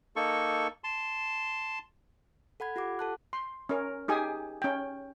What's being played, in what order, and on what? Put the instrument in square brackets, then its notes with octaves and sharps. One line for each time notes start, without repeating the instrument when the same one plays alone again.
[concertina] A#3 D#4 A4 C#6
A5 C6
[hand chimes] A4 F#5 B5 G#6
F4 G4 F#5 D6
A4 A5 F#6
[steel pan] C6
C#4 A#4
D#4 G4 G#4 G#5 D#6
C#4 G5